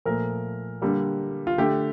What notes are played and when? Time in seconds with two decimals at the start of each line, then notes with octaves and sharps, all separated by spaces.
0.06 A#2 F3 A3 A#4
0.82 D3 G3 A#3
1.47 F4
1.58 D3 A3 G4